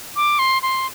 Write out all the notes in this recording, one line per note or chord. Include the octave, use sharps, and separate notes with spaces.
D6
C6
C6